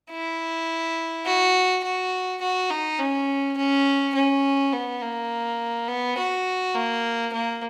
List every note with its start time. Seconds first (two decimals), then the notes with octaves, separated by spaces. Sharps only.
0.11 E4
1.25 F#4
1.84 F#4
2.41 F#4
2.70 D#4
2.99 C#4
3.57 C#4
4.15 C#4
4.72 B3
5.01 A#3
5.88 B3
6.17 F#4
6.75 A#3
7.33 A#3